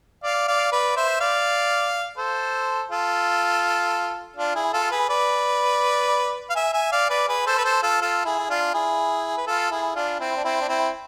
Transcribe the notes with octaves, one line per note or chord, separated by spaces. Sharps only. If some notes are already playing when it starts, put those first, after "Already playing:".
D5 F5
D5 F5
B4 D5
C5 E5
D5 F5
A4 C5
F4 A4
D4 F4
E4 G#4
F4 A4
G#4 B4
B4 D5
F5
E5 G#5
E5 G#5
D5 F5
B4 D5
G#4 B4
A4 C5
B4
A4 C5
F4 A4
F4 A4
E4 G#4
E4
D4 F4
E4 G#4
B4
F4 A4
E4 G#4
D4 F4
C4 E4
D4
C4 E4
D4
C4 E4